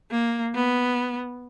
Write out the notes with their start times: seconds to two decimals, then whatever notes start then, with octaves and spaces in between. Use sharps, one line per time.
0.11 A#3
0.55 B3